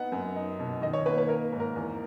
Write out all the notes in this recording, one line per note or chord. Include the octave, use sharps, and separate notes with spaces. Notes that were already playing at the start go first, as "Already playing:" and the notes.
Already playing: B3 D#4 F#5
F#2
D#4
B2
D#3 D#5
C#5
A#3 B4
B4
A#3 A#4
G#2
A#4
E2